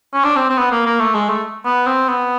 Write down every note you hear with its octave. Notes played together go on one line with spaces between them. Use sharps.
C#4
D4
C4
C4
B3
A#3
A#3
A3
G#3
A3
B3
C4
B3